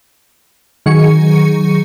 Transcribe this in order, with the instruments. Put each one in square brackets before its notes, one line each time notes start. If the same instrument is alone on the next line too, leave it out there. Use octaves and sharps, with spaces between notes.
[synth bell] D#3 F#3 G#4 C#6 C#7